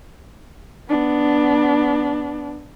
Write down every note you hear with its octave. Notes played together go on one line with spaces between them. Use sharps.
B3 D4